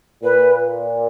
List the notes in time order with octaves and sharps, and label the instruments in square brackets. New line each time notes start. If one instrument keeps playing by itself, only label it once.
[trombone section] A#2 [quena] B4